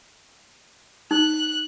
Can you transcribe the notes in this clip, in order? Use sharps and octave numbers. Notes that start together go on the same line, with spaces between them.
D#4 F#6